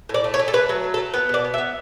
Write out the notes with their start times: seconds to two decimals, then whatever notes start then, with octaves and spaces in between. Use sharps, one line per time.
0.09 A2 D5
0.24 A3
0.34 C#5
0.39 A3
0.48 A4
0.53 A3 B4
0.69 F#3
0.84 A3
0.94 A4
0.98 A3
1.14 B3 B4
1.29 B2 D5
1.44 B3
1.54 E5
1.58 B3